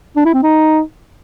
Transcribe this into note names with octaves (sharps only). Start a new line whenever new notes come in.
D4
E4
C4
D#4